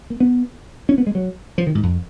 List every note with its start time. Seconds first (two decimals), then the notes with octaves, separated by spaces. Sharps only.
0.10 A#3
0.20 B3
0.89 C#4
0.98 B3
1.07 G#3
1.15 F#3
1.58 F3
1.67 D#3
1.75 G#2
1.83 F2